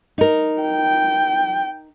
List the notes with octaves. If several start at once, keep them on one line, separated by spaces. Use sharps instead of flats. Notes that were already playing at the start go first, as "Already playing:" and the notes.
D#4 A#4
G5